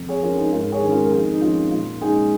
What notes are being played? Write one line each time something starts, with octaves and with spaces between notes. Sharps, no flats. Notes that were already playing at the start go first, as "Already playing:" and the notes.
Already playing: F2
G#4 C#5
F3 C#4 F4 A#4
D#4 G#4
G#2 F4 A#4
G#4 C#5
D#3 G#3 C#4
F4 A#4
A#4
F2 D#4 G#4
D#4
F3 C#4 F4
A#2 F4
G#3 C#4 D#4 G#4